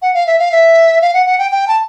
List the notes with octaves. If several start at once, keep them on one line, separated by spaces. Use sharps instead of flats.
F#5
F5
E5
F5
E5
F5
F#5
F#5
G5
G5
A5